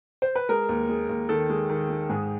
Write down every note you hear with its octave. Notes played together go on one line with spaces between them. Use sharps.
C5
B4
G#3 A#4
D#2
G#3
D#2
D#3 A4
G#3
D#3
G#3
G#2 G#4